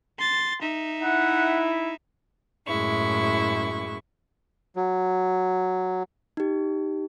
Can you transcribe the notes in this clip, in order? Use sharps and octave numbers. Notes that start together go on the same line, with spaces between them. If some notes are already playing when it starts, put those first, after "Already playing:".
C6 A6
D#4 E5
E4 F#5
F#2 A2 G#3 E4 C#6
F#3
D#4 G4